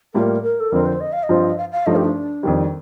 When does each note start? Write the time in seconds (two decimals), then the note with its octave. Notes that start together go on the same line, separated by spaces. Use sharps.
0.14 A2 G3 A#3 F4 A#4
0.43 A#4
0.60 A4
0.72 F2 D3 F3 C4 A#4
0.86 C5
1.00 D#5
1.12 F5
1.23 D#5
1.29 G2 F3 C4 F4
1.58 F5
1.72 F5
1.86 G2 F3 A3 D#4 D#5
1.96 G4
2.05 D4
2.43 F2 D#3 G3